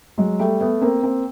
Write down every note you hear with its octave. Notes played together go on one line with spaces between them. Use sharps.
F#3 G#3
G3 A3
A3 B3
A#3 C4
A#3 C4